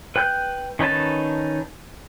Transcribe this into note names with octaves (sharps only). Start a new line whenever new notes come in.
B4 G5 F#6 G6
D#3 C#4 D#4 B4 A5